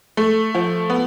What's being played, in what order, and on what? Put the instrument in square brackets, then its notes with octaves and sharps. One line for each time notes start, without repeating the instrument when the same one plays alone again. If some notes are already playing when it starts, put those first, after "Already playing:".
[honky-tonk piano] A3
F3
B3